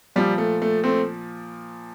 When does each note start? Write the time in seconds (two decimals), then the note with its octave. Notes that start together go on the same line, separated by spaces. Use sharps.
0.16 A#2 F3 G3
0.38 A3
0.62 A3
0.84 A3 C4